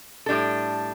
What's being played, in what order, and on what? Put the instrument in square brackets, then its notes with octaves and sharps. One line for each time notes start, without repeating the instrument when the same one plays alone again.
[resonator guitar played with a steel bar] A2 G3 D4 A4